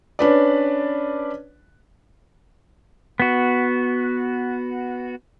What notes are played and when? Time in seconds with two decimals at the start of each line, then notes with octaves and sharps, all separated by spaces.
0.19 C#4 D4 B4 D5
3.20 B3 F#4